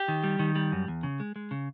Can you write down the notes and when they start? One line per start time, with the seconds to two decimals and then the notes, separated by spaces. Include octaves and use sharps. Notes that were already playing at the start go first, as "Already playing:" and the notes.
Already playing: G4
0.08 D#3
0.24 G3
0.39 D#3
0.55 G3
0.72 F#2
0.88 E2
1.03 C#3
1.20 G#3
1.36 G#3
1.51 C#3